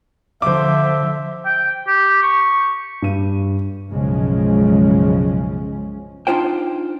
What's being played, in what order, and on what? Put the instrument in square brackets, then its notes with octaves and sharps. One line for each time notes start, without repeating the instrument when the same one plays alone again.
[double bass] D3 F3 [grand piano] C5 D6 [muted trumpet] E5
[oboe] G5
G4
C#6
[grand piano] G2 D#7
[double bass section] B1 F#2 C#3 F3 G#3 C#4
[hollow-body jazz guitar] D4 D#4 F4 C5 G5